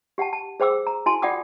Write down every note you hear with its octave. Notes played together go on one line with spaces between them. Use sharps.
G4 F#5 G5 A5
A5
G#4 C5 G5 D6 E6
A#5
E4 F#4 G#5 A5 C6
F4 D5 F#5 G5 D6 D#6